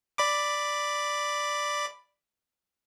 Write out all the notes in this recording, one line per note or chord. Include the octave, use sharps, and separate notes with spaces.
D5 B5 D6